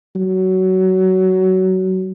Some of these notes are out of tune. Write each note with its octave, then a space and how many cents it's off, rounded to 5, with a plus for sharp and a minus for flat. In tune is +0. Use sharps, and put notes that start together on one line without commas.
F#3 +20